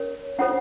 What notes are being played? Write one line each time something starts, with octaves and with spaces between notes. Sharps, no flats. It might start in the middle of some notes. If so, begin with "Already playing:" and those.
Already playing: C#4 A#4 C#5
C#4 F4 A4 C5 F#5